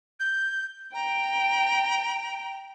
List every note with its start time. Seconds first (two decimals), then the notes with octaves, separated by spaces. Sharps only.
0.20 G6
0.94 G5 A#5